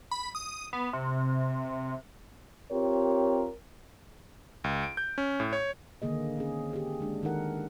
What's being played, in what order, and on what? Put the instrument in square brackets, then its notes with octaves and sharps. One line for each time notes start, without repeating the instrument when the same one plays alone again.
[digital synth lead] B5
D#6
B3
C3
[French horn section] C4 F4 G4 A#4 C#5
[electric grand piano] C#2
D7
G6
C#4
A2
C#5
[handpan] D3 D#3 A#3 G#4 D#5
C4 C#4 G#4
G4 G#4
G#3 D4
D#3 D#4 A4 A#4 F#5